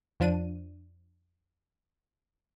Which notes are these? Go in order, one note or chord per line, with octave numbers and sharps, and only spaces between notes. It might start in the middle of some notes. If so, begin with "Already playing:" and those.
F2 F3 D4 D#7